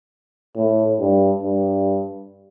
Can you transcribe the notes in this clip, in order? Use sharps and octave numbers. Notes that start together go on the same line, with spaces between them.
A2
G2
G2